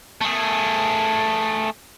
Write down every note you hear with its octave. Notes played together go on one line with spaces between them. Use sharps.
A3 G#4